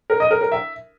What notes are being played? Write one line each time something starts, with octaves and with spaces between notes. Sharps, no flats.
A#4
D#5
A#4
A#4
E5